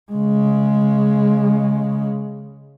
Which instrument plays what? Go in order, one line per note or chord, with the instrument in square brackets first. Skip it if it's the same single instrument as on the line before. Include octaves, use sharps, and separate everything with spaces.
[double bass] C#3 G#3